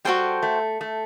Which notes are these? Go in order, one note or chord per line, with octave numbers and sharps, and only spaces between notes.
G3 F#4 A4 C5 G5
A3
A3